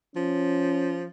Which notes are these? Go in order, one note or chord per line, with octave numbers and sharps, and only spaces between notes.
F3 C#4